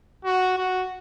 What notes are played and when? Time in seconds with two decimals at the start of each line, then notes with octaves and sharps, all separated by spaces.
0.25 F#4
0.58 F#4